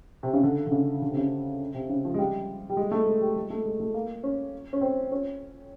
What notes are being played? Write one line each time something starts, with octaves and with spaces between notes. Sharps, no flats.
C3
C#3
D3
D3
C#3
D3
C3
C#3
C3
C#3
F3
G#3
G3
G3
G#3
A3
G#3
G3
G#3
A3
G#3
A3
A#3
C#4
C#4
C4
C#4